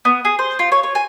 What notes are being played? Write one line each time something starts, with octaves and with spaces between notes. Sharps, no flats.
B3
G#4
C5
F4
C#5
C#5
G#5